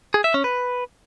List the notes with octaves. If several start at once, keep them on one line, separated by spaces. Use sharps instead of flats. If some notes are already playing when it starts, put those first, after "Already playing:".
G#4
E5
C#4
B4